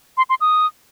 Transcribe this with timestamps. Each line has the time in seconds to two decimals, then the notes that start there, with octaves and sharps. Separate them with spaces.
0.17 C6
0.30 C6
0.41 D#6